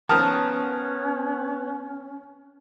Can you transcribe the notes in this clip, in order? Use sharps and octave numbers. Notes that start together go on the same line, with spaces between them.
D#3 F3 B3 C#4 A5 D#6 F6